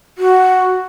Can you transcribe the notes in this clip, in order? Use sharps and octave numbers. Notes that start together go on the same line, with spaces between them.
F#4